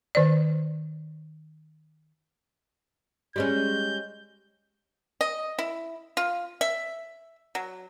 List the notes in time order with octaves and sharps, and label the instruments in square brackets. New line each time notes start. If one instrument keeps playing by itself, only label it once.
[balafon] D#3 C5 D5
[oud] G3 G#3 C#4 [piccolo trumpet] G6
[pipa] D#5
E4
F4
E5
F#3